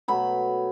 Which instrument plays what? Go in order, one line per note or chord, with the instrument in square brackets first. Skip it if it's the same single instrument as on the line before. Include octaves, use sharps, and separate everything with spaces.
[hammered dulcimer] B2 F#3 A3 B5